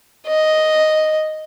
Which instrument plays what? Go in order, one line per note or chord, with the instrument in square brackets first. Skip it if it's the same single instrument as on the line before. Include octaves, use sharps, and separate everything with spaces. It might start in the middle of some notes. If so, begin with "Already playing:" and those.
[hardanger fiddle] D#5